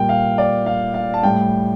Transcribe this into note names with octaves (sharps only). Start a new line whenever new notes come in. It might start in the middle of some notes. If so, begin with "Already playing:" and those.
Already playing: A#2 G3 G5
F5
D5
F5
F5
A5
A2 G3 G5